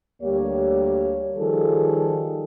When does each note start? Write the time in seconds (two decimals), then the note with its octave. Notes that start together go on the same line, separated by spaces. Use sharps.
0.23 D2 G3 A#3 G4 C#5
1.38 D#3 F3 G3 F4 G#4 A4